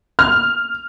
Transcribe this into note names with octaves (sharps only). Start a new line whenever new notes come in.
F6